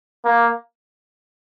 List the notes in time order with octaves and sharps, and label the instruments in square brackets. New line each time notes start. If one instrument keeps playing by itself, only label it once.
[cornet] A#3